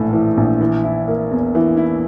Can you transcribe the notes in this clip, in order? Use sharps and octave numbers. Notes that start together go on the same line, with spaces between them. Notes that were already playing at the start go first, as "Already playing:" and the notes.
Already playing: A#1 A2 E3 A3
E3
A#1
E3
E4
A#3
E2
E3
E4